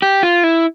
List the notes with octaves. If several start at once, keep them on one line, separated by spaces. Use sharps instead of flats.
G4
F4
E4